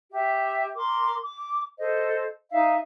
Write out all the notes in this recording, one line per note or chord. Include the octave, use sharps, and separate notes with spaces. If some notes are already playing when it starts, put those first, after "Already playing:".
G4 E5
A#4 C6 D6
D6
A4 C5 D#5
D#4 E5 F5